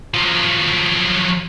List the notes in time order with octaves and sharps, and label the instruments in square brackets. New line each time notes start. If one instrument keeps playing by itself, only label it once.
[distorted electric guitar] F3 F#3